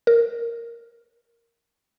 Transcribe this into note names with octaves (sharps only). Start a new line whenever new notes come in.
A#4